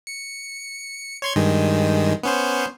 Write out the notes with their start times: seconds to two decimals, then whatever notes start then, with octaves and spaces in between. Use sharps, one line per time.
0.07 C#7
1.22 C#5 C6 G#6
1.36 G2 D#3 G#3
2.23 B3 C#4 C5